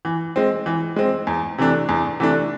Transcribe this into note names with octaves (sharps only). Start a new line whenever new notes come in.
E3
G#3 C4
E3
G#3 C4
E2
C3 E3 A3 D4
E2
C3 E3 A3 D4